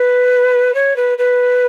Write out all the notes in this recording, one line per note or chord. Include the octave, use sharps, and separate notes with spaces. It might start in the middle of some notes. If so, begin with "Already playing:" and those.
Already playing: B4
C#5
B4
B4